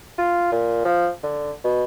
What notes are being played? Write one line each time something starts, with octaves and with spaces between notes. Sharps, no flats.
F4
A#2
F3
D3
B2